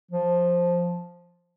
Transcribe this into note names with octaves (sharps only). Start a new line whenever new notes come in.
F3